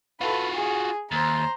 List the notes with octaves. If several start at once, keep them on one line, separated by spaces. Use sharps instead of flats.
F4 F#4 A4 B4
G#4
D#2 C5 A#5